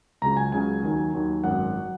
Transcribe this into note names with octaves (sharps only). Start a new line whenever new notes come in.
C#2 C#3 F#3 A#5
G#5
C#2 C#3 F#3 G#5
D#2 D#3 F#3
D#2 D#3 F#3
G#1 F#2 F#3 F#5
F#3